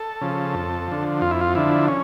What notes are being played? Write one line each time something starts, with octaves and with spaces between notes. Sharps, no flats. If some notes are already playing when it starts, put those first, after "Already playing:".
Already playing: A4
C#3 F3
F2
D3 F3
F2 F4
E4
F4
D3 F3 E4
C#4